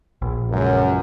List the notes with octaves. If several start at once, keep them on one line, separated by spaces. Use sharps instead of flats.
A#1
C#2 F#2